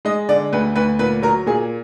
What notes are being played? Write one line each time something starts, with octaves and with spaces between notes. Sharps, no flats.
G#3 D#5
D3 D5
D2 B4
D2 B4
A#2 B4
F#3 A#4
A#2 G#4